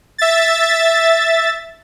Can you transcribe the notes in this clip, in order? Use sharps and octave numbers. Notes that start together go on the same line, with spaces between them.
E5 A6